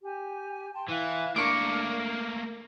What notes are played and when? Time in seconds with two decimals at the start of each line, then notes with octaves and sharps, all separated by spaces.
0.03 G4 G#5
0.73 G5 A5 C6
0.89 E3 E4 F5 F#6
1.36 A3 A#3 D4 A#4 C#6 D6